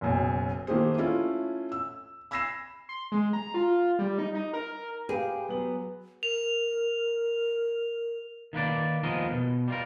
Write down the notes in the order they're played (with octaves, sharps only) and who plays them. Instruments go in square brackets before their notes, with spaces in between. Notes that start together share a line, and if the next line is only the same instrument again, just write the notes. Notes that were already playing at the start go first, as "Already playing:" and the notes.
[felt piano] F#1 B1 F#2
D#3 A3 A#3 G4 G#4 C5
A3 C#4 E4 F4
E6
B5 E6 G#6 A#6 C7 E7
[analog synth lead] C6
G#3
A#5
F4
G3
D#4
D#4
A#4
[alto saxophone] G4 [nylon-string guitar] G#4 [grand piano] B4 F5
[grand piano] F#3 F#7 [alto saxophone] B3
[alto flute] A#4 [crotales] F7
[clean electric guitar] D#3 A#3 B4 D5
D#2 F3 G#3 B3 A#4 D#5
B2
G3 F4 A#4